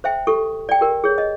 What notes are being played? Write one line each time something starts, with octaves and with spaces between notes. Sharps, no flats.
C5 E5 G5
G4 A4 C#6
D5 G5
G4 A#4 D5
G#4 C#5
D#5